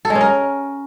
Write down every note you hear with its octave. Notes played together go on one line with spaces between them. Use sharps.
A4
G#3
C#4
A#4